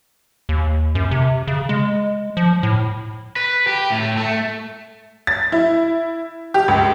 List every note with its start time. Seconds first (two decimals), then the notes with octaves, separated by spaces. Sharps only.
0.49 D#2
0.95 F#2
1.11 C3
1.47 C#3
1.69 G#3
2.37 F3
2.63 A2
3.36 B4
3.67 G4
3.90 A2
4.17 A3
5.27 A6
5.52 E4
6.54 G4
6.68 C#2